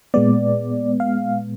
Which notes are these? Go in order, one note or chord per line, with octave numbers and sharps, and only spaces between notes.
A#2 G#3 B3 D5
F5